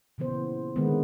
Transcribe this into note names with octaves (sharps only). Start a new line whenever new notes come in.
A#2 C#3 E3 B3 C5
D3 D#3 G#3 A#3 B3